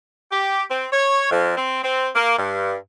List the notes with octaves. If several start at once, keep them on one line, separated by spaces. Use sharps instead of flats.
G4
C4
C#5
F2
C4
C4
A#3
G2